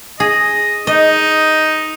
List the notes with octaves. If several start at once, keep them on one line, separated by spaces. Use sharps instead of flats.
G#4 D#5
D#4 D#5